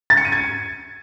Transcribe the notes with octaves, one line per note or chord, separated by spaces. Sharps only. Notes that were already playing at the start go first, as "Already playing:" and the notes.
A6
C#7
D#7
G#6